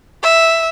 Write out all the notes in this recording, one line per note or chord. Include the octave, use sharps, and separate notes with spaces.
E5